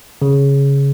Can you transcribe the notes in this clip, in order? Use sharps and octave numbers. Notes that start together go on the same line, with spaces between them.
C#3